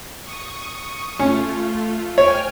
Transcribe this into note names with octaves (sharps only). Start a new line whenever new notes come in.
C#6 D#6
A3 C#4 F4
C#5 G5 G#5 F6